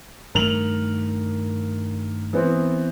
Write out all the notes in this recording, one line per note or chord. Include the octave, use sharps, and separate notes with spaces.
G2 D#3 A3 A#4 F7 F#7
E3 B3 C4